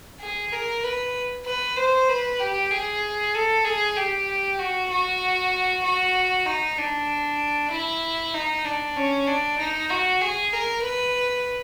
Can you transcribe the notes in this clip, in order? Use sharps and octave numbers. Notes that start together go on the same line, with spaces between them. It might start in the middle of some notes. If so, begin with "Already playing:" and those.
G#4
A#4
B4
B4
C5
B4
G4
G#4
A4
G#4
G4
F#4
F#4
F#4
D#4
D4
E4
D#4
D4
C#4
D4
D#4
F#4
G#4
A#4
B4